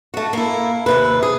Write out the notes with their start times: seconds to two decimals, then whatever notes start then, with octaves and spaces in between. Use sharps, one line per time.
0.14 A3 F#4
0.33 A#3 E4
0.86 D#2 C3 B4
1.23 G#4